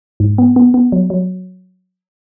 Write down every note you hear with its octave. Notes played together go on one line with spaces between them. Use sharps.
G#2
B3
B3
B3
F#3
F#3